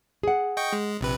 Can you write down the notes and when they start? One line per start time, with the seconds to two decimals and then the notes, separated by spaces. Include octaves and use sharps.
0.23 G#4 F#5
0.57 D#5 G5 C#6
0.73 G#3
1.01 A#1 C3 B4